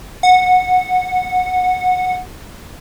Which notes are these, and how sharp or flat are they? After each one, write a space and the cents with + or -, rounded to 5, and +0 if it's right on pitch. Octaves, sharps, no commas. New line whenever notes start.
F#5 -15